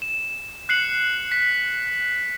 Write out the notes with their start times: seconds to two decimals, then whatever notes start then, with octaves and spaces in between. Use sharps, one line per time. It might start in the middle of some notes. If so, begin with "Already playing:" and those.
0.02 E7
0.69 F#6 C7 C#7 F#7
1.32 B6